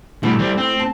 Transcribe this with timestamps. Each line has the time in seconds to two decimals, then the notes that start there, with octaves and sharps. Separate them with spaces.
0.23 B2 G3 A3 E4
0.39 G3 C4
0.57 C4
0.80 A5